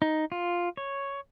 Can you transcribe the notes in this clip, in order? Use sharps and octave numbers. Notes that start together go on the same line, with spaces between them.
D#4
F4
C#5